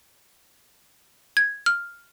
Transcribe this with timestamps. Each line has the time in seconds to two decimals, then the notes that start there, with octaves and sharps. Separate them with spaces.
1.37 G#6
1.66 F6